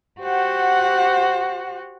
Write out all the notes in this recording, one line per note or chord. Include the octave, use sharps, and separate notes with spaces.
F#4 G4 C5 F#5